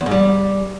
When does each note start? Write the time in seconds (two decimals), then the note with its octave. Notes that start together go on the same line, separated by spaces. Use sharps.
0.01 E2
0.06 G#2
0.11 G3